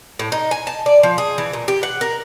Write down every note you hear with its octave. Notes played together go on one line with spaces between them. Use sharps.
A2
D#4
G#5
A5
D5
F3
G#4
E3
A#2
G4
F#5
A#4